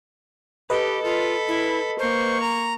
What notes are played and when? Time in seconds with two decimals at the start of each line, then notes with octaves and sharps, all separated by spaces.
0.70 G4 A4 B4 D#5
1.04 F4 A4 B5
1.48 E4
1.99 A#3 C5 C#6
2.40 A#5